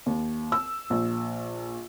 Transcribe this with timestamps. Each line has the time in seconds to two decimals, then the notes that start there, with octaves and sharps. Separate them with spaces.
0.06 D#2
0.52 E6
0.90 A#1